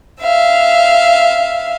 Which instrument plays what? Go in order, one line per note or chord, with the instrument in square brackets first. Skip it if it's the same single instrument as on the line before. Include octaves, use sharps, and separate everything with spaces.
[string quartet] E5 F5